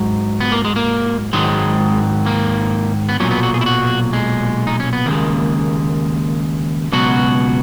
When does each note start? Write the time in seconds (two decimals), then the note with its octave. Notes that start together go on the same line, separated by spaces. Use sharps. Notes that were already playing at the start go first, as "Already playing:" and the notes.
Already playing: G#2 F#3
0.41 B3
0.52 A#3
0.65 G#3
0.76 A#3
1.33 G#2 D#3 F#3 G#3
2.26 A#3
3.09 B3
3.20 B1 A#2 F#3 C#4
3.31 B3
3.43 F#4
3.54 G#4
3.61 E4
3.66 F#4
4.13 G#3
4.67 D#4
4.80 C#4
4.93 B3
5.06 D#2 C#3 G#3 A#3
6.92 C#2 B2 F#3 F#4